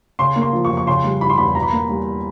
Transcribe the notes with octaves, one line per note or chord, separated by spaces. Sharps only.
C#3 C6
A#3
C6
F3
C#6
F2
C#6
C#3 C6
G3
E3 B5
C6
E2 B5
B2 A#5
B5
A#3 A#5
G3